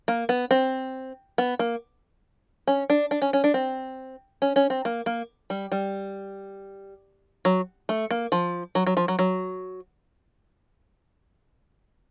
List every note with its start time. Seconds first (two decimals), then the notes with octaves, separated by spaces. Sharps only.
0.08 A#3
0.29 B3
0.51 C4
1.38 B3
1.59 A#3
2.67 C#4
2.90 D4
3.11 D4
3.22 C#4
3.33 C#4
3.44 D4
3.54 C4
4.42 C#4
4.56 C#4
4.70 C4
4.85 A#3
5.06 A#3
5.50 G3
5.72 G3
7.45 F#3
7.89 A3
8.11 A#3
8.32 F3
8.75 F#3
8.86 F#3
8.97 F3
9.08 F#3
9.19 F#3